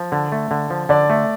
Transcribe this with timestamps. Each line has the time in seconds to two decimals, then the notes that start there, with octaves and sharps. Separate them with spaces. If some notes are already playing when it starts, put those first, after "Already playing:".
Already playing: F3
0.12 D3
0.32 A3
0.51 D3
0.70 F3
0.89 D3 D5
1.10 A3